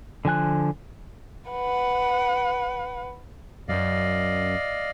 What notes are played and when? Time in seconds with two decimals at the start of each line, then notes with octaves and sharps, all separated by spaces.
0.25 D3 F3 G#5 F#6
1.51 B4 F#5
3.68 F#2 D5 D#5 F5